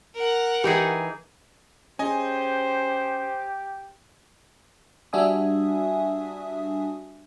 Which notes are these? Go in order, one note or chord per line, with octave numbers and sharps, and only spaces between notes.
A#4 F#5
E3 D#4 G4 G#4
C#4 G4 G#4 C5 D#5 G#5
G3 D4 F#4 E5 G#5 D#6